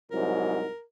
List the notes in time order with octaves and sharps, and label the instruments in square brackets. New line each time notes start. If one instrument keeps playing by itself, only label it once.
[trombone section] C2 G#2 F#3 [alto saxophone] A#4